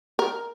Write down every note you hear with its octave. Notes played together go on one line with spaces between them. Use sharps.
A#4